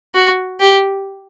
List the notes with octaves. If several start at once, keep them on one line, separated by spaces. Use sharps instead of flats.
F#4
G4